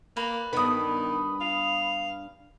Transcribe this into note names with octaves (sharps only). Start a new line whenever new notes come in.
A#3 B4 D5
G2 D#3 B3 B5 D#6
F5